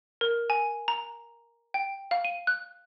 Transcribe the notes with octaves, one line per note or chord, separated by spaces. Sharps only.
A#4
G#5
A#5
G5
F5
D#7
F#6